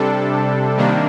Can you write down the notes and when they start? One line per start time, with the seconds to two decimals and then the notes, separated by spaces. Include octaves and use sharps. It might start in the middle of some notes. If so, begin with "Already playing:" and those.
Already playing: C3 G3 D4 A4
0.77 C3 D#3 G3 A#3 D4